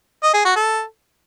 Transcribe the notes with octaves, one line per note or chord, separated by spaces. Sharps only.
D#5
G#4
F#4
A4